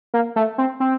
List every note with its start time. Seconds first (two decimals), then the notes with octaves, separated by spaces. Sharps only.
0.14 A#3
0.36 A3
0.58 C4
0.80 C4